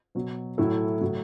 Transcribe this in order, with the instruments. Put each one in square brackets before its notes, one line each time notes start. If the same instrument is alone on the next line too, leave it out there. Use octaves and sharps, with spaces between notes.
[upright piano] B2 F#3
A2 F#3 E4 A4
A2 F#3